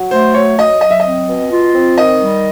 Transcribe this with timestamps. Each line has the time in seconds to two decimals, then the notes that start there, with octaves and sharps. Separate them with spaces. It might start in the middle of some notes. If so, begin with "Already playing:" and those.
Already playing: F#3
0.11 A3 C5
0.34 F#3 C#5
0.58 F#3 D#5
0.81 F#3 D#5
0.91 E5
1.00 D#5
1.05 C4
1.28 B2
1.51 F4
1.74 C4
1.97 D#3 D#5
2.20 G3